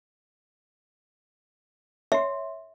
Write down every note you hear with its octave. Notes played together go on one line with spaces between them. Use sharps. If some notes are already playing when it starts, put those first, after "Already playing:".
C#5 E5 C6